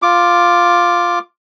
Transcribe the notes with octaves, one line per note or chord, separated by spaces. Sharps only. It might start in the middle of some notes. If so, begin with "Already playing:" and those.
F4 D6